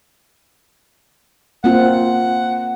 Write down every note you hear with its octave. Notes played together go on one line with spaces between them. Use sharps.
A#3 C4 F4 F#5